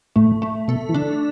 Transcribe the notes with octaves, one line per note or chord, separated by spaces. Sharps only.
A2 A3
A3
B2 A4
E3
D3 D4